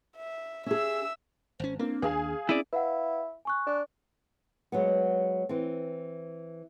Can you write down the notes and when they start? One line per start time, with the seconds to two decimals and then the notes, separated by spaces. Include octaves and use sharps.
0.16 E5
0.66 C#4 G#4 E5 E6
1.60 G#1 C#4 C5
1.79 A#3 C4 D4
2.02 D#2 G#4 F5 G#5
2.49 C4 C#4 E4 G#4 D5
2.73 E4 B4 F5 F#5
3.45 G#5 C#6 F#6
3.66 D4
4.72 F#3 G#3 B3
5.49 E3 C4